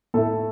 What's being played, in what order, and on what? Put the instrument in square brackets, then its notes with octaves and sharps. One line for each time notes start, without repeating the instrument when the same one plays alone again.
[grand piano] A2 A3 E4 A4